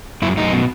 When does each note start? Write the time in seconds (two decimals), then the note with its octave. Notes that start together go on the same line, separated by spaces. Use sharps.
0.22 F#2 E4
0.37 F#2 D#4
0.52 B2